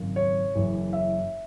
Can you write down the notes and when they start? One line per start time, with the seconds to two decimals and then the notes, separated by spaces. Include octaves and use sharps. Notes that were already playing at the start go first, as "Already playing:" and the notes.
Already playing: G#1 F#2 C#3
0.16 C#5
0.55 F#1 F#2 E3
0.93 E5